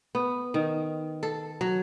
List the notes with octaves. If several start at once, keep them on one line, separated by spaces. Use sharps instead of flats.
B3
D#3
A4
F#3